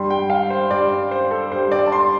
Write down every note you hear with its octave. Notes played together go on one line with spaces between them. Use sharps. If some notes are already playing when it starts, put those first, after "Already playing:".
Already playing: G2 G3 C6
G5
F5
C5
G2 G3 D5
C5
A4
G2 G3 C5
D5
A5
C6